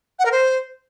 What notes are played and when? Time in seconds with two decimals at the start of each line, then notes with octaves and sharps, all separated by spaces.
0.19 F#5
0.25 A#4
0.32 C5